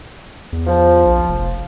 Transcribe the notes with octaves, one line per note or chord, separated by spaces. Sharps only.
E2
F3
A#1
F1